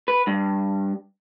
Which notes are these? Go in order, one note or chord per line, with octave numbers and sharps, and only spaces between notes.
B4
G2